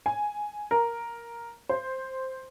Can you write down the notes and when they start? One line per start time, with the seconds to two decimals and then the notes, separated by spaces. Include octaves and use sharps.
0.06 G#5
0.71 A#4
1.69 C5